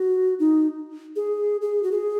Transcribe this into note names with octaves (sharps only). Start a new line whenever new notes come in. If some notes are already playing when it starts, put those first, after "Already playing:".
Already playing: F#4
D#4
G#4
G#4
F#4
G#4